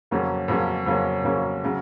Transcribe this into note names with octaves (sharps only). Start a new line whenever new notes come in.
F2 C#3 F#3 A#3 C#4
F2 C#3 F#3 A#3 C#4
F2 C#3 F#3 A#3 C#4
F2 C#3 F#3 A#3 C#4
C#3 F#3